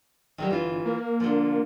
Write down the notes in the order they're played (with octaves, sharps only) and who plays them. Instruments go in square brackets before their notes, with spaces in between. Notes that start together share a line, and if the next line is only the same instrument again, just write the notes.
[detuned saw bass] G1 [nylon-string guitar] D#3 F#3 G3
[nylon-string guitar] E3 F4
[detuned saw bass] A#3
[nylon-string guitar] D3 F3